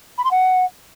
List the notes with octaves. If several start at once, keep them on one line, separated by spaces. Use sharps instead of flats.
B5
C6
F#5